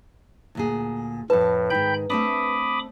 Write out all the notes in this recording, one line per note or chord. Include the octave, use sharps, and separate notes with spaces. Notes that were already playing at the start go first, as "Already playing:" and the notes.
D2 A#2 G#4
F2 A2 B4 A5
G#2 D#3 G5 B5 G6
A3 C4 D4 B5 D6 D#6